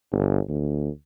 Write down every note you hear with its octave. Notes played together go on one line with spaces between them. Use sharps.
G1
D2